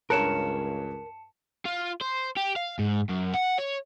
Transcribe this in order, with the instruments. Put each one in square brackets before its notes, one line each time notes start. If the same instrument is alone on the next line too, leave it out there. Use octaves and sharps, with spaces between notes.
[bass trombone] C#2 [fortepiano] G2 C#5 F#6 [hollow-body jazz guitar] A#4 [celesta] A5 C#7 E7
[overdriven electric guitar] F4
C5
G4
F5
G#2
F#2
F#5
C#5